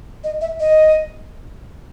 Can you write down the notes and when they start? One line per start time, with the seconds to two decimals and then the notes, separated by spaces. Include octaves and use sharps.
0.24 D#5
0.41 E5
0.60 D#5